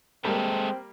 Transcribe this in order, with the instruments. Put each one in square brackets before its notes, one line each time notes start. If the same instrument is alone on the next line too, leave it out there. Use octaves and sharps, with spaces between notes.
[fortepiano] G3 A#3 [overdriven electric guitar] G#3 A4 [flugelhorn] C4